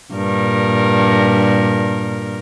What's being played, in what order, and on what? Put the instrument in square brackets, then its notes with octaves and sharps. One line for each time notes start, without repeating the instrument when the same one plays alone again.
[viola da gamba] G2 A#2 A#4